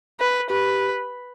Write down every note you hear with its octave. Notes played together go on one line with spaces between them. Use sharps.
B4
G4 B4